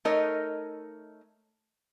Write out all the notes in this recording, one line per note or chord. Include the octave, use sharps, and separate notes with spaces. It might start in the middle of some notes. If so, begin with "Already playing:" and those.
A3 D#4 A#4 C#5 D#5